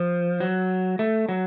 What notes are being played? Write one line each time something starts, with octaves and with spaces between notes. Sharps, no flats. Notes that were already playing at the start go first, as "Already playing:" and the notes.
Already playing: F3
F#3
A3
F#3